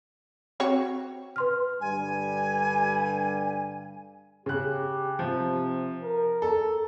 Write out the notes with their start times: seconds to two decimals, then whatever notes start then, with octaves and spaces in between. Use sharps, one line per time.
0.60 C4 F#4 C#5
1.36 B4 C6 F6
1.81 G2 D3 G3 G#5
4.46 C#3 G4 F#6
5.19 C3 F3
6.03 A#4
6.42 A4